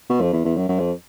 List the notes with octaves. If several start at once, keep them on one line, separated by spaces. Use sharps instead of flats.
B2
F2
E2
E2
F#2
F#2
F2